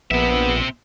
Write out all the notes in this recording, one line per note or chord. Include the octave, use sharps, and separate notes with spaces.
A#1 B3 C4 E5